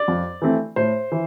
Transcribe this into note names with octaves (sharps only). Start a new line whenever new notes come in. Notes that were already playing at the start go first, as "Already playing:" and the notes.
Already playing: D5
F2
E3 A3 C4
A2 C5
E3